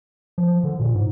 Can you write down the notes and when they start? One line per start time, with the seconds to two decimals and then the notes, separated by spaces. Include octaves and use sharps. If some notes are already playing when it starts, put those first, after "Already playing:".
0.38 F3
0.63 D3
0.79 A#2
0.95 G#2